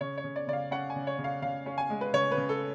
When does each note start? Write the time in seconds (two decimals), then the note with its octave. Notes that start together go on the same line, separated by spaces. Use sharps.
0.01 C#3 C#5
0.17 C#5
0.24 C#3
0.36 D5
0.47 C#3 D5
0.53 F5
0.71 C#4 F#5
0.90 G#5
0.95 C#3
1.07 C#5
1.18 C#3
1.24 F5
1.42 C#3 F5
1.66 C#4
1.78 G#5
1.90 G#3
2.01 B4
2.13 C#3 C#5
2.31 B4
2.37 C#3
2.49 A4